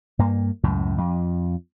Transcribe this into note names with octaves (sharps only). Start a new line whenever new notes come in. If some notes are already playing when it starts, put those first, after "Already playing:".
G2 A#3
C#2 F#2 A2
F2